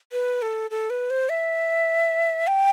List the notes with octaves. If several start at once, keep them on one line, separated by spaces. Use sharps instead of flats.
B4
A4
A4
B4
C5
E5
G5